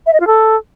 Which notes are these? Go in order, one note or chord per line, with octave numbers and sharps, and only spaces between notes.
E5
D#5
F4
A4